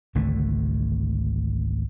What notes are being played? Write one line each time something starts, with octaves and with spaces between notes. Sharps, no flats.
G#1 C#2 D3 A3